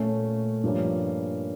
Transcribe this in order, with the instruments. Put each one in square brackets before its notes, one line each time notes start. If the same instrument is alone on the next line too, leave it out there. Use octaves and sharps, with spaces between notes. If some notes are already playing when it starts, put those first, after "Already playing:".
Already playing: [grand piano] A#2 A3 C#4
G2 F3 A#3 C#4